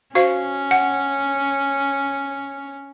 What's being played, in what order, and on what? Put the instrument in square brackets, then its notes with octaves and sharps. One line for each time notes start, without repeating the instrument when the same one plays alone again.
[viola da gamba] C#4 [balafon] F#4 C5 F5
[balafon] F#5